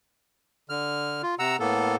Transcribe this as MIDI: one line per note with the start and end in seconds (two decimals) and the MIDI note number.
0.69 1.22 50
0.69 1.22 89
1.23 1.35 65
1.39 1.56 48
1.39 1.56 78
1.39 1.56 82
1.39 1.56 88
1.60 1.96 45
1.60 1.96 58
1.60 1.96 59
1.60 1.96 69